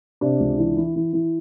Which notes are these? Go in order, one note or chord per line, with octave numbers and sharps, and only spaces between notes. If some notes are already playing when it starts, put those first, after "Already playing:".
C3 D4
C#2
E3
E3
E3
E3